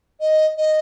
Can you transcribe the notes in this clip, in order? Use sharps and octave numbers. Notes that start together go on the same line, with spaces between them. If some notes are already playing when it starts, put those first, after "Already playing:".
D#5
D#5